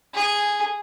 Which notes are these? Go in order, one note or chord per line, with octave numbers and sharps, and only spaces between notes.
G#4